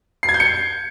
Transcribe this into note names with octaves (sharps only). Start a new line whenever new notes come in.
C7
G#6
G6
C#7